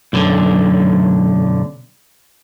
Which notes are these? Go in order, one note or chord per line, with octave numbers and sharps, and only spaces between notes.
B1 F#2 D3